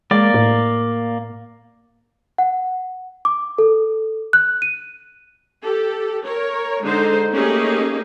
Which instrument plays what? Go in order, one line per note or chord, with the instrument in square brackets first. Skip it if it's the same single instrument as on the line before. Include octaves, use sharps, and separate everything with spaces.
[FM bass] G#3 [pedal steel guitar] A#3 D5
[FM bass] A2
[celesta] F#5
D6
A4
F#6
D#7
[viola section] G4 A4
A#4 C#5
D3 G#3 D#4 C5
A3 A#3 C#4 D#4 G4 G#4